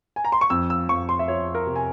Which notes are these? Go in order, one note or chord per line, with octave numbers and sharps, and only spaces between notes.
G#5
A#5
C6
C#6
F2 E6
E6
F2 C#6
C6
E5
F3 C#5
A#4
C3
G#5